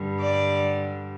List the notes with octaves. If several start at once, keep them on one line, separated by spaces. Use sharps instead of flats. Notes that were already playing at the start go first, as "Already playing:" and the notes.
Already playing: G2 D3 G3
D5